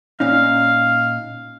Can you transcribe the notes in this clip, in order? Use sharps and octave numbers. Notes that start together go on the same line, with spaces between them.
A#2 C#4 D#4 F5